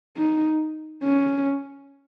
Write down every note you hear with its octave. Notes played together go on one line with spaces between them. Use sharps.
D#4
C#4